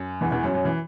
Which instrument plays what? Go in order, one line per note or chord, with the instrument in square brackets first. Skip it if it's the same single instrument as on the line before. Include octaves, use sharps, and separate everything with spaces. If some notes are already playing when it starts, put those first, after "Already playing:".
Already playing: [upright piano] F#2
E2 E3
E2 E3
F#2 F#3
F#2 F#3
E3